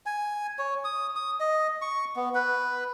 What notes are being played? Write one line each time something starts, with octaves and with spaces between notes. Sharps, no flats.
G#5
C#5
D#6
D#6
D#5
C#6
B3
B4